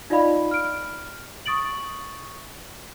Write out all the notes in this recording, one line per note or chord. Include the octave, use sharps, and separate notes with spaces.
D#4 F4 D5 D#5 F5 B5
F6 D7
C#6 D#6 A6 D7 F#7